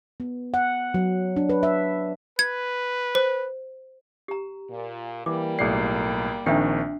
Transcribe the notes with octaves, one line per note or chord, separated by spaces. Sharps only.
B3
F#5
F#3
D4
B4
E5
B4 G#6
C5
G4 A#5
A#2
E3 G3 A#3 D6
B1 A2 G#4 D5 C7
A#1 D#3 C4 D4 E5 G5